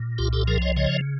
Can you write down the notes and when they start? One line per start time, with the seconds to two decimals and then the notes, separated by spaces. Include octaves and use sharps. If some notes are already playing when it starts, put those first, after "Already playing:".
Already playing: A#2
0.18 C2 F4 G4
0.33 G4 A4
0.47 F3 G#4 A#4
0.62 C#5 D#5
0.76 C#3 C#5 D#5